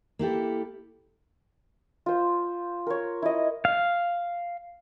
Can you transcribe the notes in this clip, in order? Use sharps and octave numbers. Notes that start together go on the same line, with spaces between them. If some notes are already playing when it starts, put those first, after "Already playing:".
A#3 E4 G4 A4
F4 C5
A#4 C#5
E4 D#5
F5